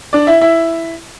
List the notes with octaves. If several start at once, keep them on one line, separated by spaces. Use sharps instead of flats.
D4 D5
E4 E5
E4 E5